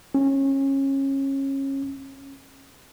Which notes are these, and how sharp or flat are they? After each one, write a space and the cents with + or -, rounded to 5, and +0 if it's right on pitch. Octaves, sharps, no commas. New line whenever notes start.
C#4 -25